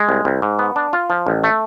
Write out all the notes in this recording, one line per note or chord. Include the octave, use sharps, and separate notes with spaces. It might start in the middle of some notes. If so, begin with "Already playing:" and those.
Already playing: G#3
C2
C2
G#2
B3
D4
F4
F3
A1
A3